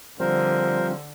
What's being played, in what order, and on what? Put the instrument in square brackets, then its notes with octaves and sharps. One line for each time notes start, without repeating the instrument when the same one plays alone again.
[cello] D3 [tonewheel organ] F3 G3 C4 [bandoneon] A#4 C5